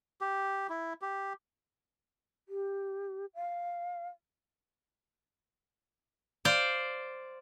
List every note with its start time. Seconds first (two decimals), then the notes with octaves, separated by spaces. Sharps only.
0.21 G4
0.70 E4
1.02 G4
2.49 G4
3.35 F5
6.45 C5 D5 F5